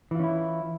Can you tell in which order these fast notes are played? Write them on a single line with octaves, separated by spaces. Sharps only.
E3 F4 C#4 E4